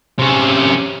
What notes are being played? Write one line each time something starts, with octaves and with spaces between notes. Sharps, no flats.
C3 C#4